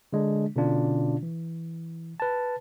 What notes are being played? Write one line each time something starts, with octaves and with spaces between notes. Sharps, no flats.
D3 G#3 D4
B2 D3 C#4 D4 F4
E3
B4 A5